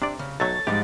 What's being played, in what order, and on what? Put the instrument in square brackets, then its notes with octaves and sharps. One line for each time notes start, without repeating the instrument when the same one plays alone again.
[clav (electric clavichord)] C3 D5 [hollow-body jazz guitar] D4
[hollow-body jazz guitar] C#3
[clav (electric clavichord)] B1 F#3 A3 [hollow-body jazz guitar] A4 C#5 [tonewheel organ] A6
[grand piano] G#2 [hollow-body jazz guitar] F3 G3 [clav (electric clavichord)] G4